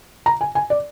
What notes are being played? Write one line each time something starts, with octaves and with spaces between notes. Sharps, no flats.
A#5
G#5
G#5
D5